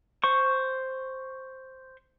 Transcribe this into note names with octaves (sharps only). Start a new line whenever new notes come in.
C5 C#6